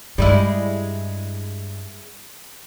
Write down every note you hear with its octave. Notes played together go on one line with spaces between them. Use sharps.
G2 G3 G#3 D4 E4